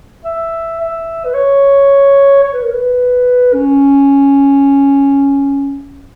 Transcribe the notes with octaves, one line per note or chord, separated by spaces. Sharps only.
E5
E5
B4
C#5
C#5
B4
A#4
B4
C#4